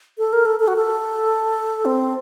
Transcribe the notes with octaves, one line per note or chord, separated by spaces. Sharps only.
A4
A#4
A4
A4
F#4
A4
C4